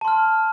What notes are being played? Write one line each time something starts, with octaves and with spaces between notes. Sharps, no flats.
A5 C6 F6